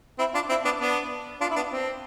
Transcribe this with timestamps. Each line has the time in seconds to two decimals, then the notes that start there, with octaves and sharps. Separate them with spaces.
0.19 C4 E4
0.34 D4 F4
0.49 C4 E4
0.65 B3 D4
0.80 B3 D4
1.41 D4 F4
1.50 E4
1.56 B3 D4
1.71 C4